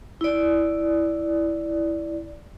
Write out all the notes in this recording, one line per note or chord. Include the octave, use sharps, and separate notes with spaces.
E4 D5